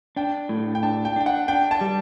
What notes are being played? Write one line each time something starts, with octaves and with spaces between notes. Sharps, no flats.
D4 G5
A2
G5
D4 A5
G5
D4 G5
F#5
D4 G5
A5
G3